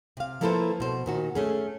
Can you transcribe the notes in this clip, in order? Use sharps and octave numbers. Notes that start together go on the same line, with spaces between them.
C3 F5
F3 A#3 E4 A4 B4 C5
B2 C5
A#2 D#3 F#4
A3 C#4 G#4